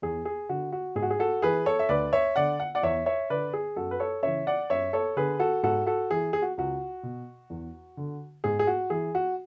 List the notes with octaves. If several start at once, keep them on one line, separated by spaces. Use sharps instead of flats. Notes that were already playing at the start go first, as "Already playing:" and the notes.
E2 G#4
G#4
D3 F#4
F#4
G#2 G#4
F#4
G#4
F#4 A4
E3 G#4 B4
A4 C#5
E5
D2 B4 D5
C#5 E5
D3 D5 F#5
F#5
D5 F#5
E2 C#5 E5
C#5 E5
D3 B4 D5
G#4
F#2 F#4 A4
B4
A4 C#5
C#3 E3 C#5 E5
D5 F#5
F#2 C#5 E5
A4 C#5
D3 G#4 B4
F#4 A4
G#2 F#4 A4
F#4 A4
E3 G#4
G#4
F#4
C#2 F#4
B2
E2
D3
G#2 G#4
G#4
F#4
E3 G#4
F#4